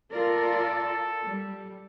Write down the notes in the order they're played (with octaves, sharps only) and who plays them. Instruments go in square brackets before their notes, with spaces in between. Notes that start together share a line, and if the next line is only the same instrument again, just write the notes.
[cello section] F4 A#4 D5 [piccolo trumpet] A4
[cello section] G3